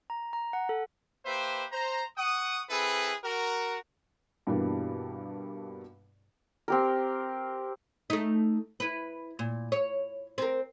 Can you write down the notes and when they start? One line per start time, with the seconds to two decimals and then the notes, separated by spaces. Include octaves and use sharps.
0.10 A#5
0.33 A#5
0.53 F#5
0.69 A4
1.26 A#3 G4 B4 C5 E5
1.72 C5 A#5
2.18 F#5 C#6 D#6
2.70 C4 E4 G#4 A4 B4
3.24 F#4 A#4
4.47 G2 B2 E3 G3 A#3 D4
6.68 C4 G4 A#4
8.10 A3 D#4
8.80 E4 B4
9.39 A#2
9.72 C#5
10.38 C4 A#4